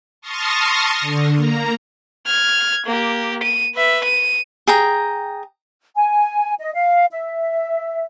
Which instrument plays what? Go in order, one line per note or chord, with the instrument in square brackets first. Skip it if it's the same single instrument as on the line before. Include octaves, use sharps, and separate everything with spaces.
[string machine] A5 C6 C#6 D#6 F6 A#6
D3
A#3 A#5
[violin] F6 G#6
A#3 G4
D#7
B4 E5
D#7
[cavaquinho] G#4 G5 A#5
[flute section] G#5
D#5
F5
E5